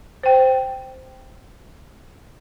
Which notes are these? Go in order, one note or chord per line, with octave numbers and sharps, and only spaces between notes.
C5 G5